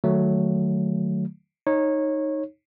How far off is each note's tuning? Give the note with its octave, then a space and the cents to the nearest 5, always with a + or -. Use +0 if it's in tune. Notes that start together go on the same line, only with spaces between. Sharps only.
D#3 -40 F#3 +0 A3 +0
D#4 +0 C#5 -20